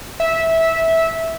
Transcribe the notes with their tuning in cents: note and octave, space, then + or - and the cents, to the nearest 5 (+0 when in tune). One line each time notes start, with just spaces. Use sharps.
E5 -15